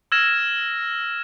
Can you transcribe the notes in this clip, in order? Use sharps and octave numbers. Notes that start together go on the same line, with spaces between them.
E6 F6 G#6 A#6 E7